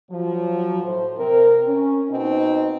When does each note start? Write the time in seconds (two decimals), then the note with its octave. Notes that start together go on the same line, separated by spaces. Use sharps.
0.11 F3 F#3
0.84 A2 C5
1.18 C3 C4 A#4
1.67 C#4
2.11 B2 C4 D#4